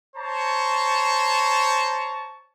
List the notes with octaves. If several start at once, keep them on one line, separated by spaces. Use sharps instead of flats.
C5 C#5 A5 A#5 C#6